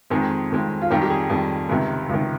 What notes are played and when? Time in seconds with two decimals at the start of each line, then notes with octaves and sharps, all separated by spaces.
0.10 F2 D#3 G#3 C4 G#4
0.51 F2 D#3 G#3 C4
0.82 F4
0.90 F2 D#3 G3 G4
1.02 G4
1.10 G#4
1.30 F2 D#3 G3
1.69 C#2 C3 D#3
2.09 C#2 C3 D#3